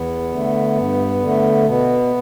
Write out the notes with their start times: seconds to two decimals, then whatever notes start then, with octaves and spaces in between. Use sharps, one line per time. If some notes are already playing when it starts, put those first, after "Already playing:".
Already playing: E2 B3
0.32 D3 A3
0.77 G2
1.21 D3 A3
1.67 B2 B3